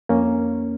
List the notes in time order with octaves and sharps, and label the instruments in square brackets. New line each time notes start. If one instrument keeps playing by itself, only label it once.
[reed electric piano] F2 A#3 C#4